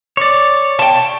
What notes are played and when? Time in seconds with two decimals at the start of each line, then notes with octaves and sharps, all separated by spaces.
0.17 C#5 D5
0.79 G5 A5